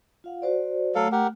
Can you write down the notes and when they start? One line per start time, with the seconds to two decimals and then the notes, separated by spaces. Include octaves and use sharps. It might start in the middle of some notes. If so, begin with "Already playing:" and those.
0.24 F4 F5 F#5
0.42 F#4 C5 D5
0.95 F#3 A3 A4 F5
1.12 G4 A#4 F#5